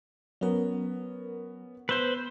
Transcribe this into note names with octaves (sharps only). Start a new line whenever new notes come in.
F#3 B3 C#4 A#4
B3 B4 C5 E6 G6